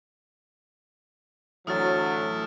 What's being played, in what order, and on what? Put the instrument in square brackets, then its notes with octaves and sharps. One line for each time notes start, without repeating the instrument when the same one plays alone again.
[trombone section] D2 F#3 [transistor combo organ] E3 A3 E4 [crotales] D#6 F6 A6